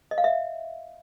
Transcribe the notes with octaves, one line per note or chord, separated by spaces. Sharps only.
D#5
F5
E5